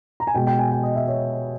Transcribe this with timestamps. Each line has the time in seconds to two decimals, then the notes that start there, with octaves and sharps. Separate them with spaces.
0.20 A#5
0.27 G#5
0.35 B2 G#3 G5
0.47 G5
0.59 G#5
0.72 G5
0.83 D#5
0.96 E5
1.08 C#5